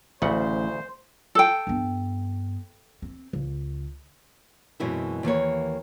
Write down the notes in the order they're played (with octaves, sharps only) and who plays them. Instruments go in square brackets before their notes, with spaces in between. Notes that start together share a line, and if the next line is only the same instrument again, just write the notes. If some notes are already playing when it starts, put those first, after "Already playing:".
[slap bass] A1 [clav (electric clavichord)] D2 C#3 F#5 [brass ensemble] C5
[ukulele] A4 G5
[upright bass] G2 B3
C4
C#2
[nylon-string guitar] F#2 B2 E3 G#3 C4 E4
D#2 E3 A#3 C#5